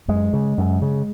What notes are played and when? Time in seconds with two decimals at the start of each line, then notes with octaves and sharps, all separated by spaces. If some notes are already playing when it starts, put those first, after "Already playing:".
0.08 F#2 G#3
0.33 C#3
0.58 F#2
0.82 C#3